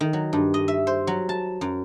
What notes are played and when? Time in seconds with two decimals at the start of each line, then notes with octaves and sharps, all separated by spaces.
0.01 D#3
0.13 F#3
0.33 G2
0.54 D#5
0.68 E5
0.87 C5
1.07 F#3
1.29 A5
1.61 F#2